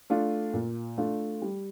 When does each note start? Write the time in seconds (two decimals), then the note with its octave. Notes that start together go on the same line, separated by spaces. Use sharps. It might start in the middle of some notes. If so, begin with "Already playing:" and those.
0.10 A3 D4 F4
0.53 A#2
0.98 A3 D4 F4
1.42 G3